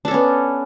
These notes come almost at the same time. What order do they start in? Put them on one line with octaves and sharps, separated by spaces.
D4 A4 C#4 B3